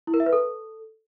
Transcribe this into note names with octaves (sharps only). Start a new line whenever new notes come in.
E4
A#4
E5
B4
A4